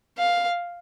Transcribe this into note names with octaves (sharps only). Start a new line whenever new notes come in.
F5